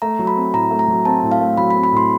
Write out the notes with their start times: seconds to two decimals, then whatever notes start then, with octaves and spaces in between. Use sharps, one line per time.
0.02 A3 A#5
0.19 F#3
0.27 B5
0.36 C4
0.54 A2 A#5
0.71 A3
0.79 A#5
0.88 F#3
1.05 C4 A5
1.23 A2
1.31 F5
1.40 A3
1.57 F#3 B5
1.71 B5
1.75 C4
1.84 B5
1.92 A2 C6